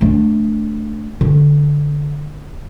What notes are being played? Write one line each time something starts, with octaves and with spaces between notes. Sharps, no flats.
A3 D4
D3